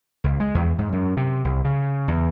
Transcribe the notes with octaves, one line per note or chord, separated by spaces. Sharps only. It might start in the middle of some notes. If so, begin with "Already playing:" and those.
C#2
G#3
E2
G#2
F#2
C3
C2
C#3
E2